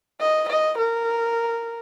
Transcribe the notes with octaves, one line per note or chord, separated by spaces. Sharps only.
D#5
D#5
A#4